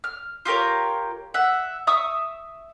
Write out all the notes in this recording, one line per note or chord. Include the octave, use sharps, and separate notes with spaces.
F6
F4 G4 A#4 C#5
E5 F#5
E5 C#6 D#6